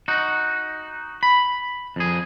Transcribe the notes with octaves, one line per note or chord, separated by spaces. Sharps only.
D#4 F#4
B5
F2 G#4